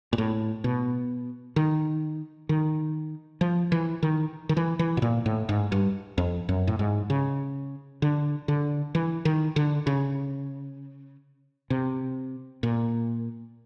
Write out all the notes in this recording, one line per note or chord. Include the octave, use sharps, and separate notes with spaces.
A#2
A2
B2
D#3
D#3
F3
E3
D#3
D#3
E3
E3
B2
A#2
A2
G#2
G2
F2
F#2
A2
G#2
C#3
D3
D3
E3
D#3
D3
C#3
C3
A#2